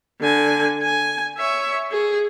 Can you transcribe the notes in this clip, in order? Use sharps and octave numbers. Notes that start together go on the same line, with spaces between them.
D3 G#5
G#5
C#5 E5
G#4